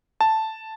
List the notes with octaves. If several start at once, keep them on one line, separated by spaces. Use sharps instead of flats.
A5